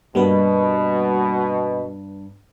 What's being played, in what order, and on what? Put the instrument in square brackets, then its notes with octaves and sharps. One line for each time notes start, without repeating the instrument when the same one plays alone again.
[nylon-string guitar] G2 B3 [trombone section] B2 [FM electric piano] G3 A#3 B4